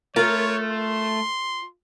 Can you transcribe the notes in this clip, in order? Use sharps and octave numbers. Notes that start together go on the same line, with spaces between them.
A3 F4 A#4 C#5
C6